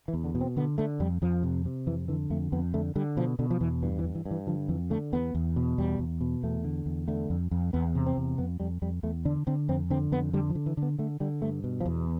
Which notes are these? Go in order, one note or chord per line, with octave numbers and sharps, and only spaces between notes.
E3
E2
D3
B2
C4
D3 B3
D3 A3
F2 G3
F2 F3
C3
C3
F2 E3
D3 E3
F2 A3
F2 B3
D3 A3
D3 G3
B2 F3
B2 D3
F3
E2 E3
G2 E3
E3
G2
E3
G2
E3
D3 F3
F2 E3
D3 A3
E2 B3
E2
B2
E2 G3
E2
B2
E2 A3
D3
E2
D3 A3
F2
F2
E2 B3
C3
C4
E2
F2 B3
F2 G3
F2 G3
E2 A3
D3 D4
D3 C4
F2 C4
D3 C4
F2 B3
D3 G3
F3
D3
E3
D3
B3
D3 A3
D3 G3
G2 A3
B2
F3
E2